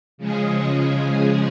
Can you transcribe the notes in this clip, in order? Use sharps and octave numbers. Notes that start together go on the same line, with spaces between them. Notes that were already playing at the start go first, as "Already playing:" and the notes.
C#3 F3 G#3 C#4 G#4